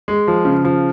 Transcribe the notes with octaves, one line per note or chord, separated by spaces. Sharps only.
G#3
F3
C#3
F3